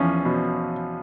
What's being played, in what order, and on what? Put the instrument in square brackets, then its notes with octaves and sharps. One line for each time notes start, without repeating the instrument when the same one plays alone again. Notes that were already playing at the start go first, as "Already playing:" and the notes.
Already playing: [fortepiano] E2 C#4 [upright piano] F3
[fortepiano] B2